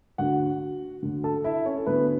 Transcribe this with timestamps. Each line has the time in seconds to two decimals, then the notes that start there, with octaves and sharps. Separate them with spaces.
0.18 D2 D3 F#4 F#5
1.03 D2 D3
1.24 A4 A5
1.44 E4 E5
1.66 C#4 C#5
1.78 A4
1.86 D2 D3 B3 B4